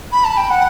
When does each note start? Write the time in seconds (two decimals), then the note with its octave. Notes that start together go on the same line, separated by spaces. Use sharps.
0.12 B5
0.24 A5
0.37 G5
0.50 F#5